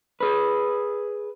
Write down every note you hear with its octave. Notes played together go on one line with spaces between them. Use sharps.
G#4 B4